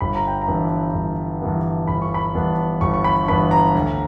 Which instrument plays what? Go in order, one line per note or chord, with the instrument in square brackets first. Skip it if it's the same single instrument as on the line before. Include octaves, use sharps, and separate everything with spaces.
[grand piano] G1 B5
A#5
G5
A#5
G2 E3 B3 D4
G1
G2 E3 B3 D4
G1 B5
C#6
B5
G2 E3 B3 D4
G1 C#6
C#6
B5
C#6
G2 E3 B3 D4 B5
A#5
D2